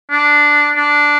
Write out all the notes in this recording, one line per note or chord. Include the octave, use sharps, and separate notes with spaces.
D4
D4